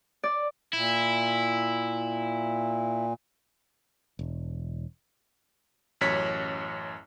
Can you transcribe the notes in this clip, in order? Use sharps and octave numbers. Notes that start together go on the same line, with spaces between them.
D5
A#2 E4
E1
A1 F#2 C#5 B6